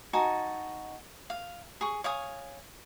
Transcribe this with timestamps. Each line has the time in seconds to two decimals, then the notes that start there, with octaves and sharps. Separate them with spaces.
0.13 D#4 F#4 G#5 A5
1.30 F5
1.81 G#4 C#6
2.04 C#5 F5 G#5 D#6